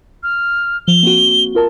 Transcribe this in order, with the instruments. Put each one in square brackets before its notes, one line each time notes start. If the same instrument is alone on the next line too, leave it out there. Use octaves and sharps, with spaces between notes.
[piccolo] F6
[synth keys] F3 [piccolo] G7
[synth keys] A#3 C4 F#4
F4 A#4 A5